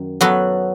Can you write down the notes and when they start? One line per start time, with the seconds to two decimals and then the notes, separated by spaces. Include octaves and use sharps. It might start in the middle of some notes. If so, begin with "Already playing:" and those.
Already playing: F#2 D#3
0.21 F#3 B3 F#4 A4